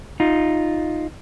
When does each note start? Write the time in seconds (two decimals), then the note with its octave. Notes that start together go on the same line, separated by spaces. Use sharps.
0.20 D#4 F4